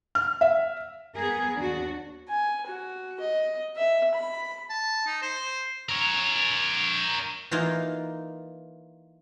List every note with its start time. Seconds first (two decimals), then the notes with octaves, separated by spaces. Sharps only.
0.15 F6
0.41 E5
1.15 B3 G#4 A#4
1.56 D#2 D4 F#4
2.29 G#5
2.66 F#4
3.20 D#5
3.77 E5
4.15 B5
4.70 A5
5.07 D#4
5.22 C5
5.89 A#4 C#5
7.51 E3 A#3 D#4 F4